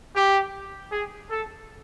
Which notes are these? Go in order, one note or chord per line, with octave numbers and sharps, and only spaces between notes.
G4
G#4
A4